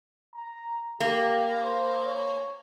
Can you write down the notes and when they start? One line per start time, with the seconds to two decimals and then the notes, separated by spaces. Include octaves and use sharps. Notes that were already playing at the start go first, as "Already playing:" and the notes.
0.35 A#5
1.00 A#3 G4
1.64 C5
2.05 C#5